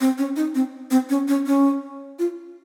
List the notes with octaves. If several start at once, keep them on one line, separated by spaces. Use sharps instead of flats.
C4
C#4
D#4
C4
C4
C#4
C#4
C#4
F4